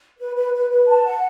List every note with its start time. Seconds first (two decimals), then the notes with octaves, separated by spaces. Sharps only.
0.18 B4
0.35 B4
0.53 B4
0.70 B4
0.88 A5
1.04 F#5